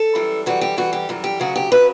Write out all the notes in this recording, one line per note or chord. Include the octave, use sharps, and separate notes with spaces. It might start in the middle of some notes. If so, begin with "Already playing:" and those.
Already playing: A4
F#2 E3 G3
F#2 E3 G3 F#4
G4
F#2 E3 G3 F#4
G4
F#2 E3 G3
G4
D2 C#3 F#3 F#4
G4
C#3 F#3 B4